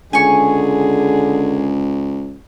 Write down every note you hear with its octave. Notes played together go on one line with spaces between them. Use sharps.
C#2 D3 G#4 G#5 C#6